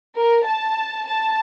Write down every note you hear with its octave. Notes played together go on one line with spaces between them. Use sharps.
A#4
A5
A5